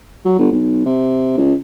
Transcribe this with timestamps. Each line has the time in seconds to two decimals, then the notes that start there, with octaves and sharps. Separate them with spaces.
0.25 F#3
0.39 G1
0.52 B1
0.86 C3
1.37 C#2